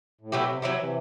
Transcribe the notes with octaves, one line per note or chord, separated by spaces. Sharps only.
A2
B2 F#3 A3 E4 G4
C3
C3 F#3 A3 E4 G4
C3 E3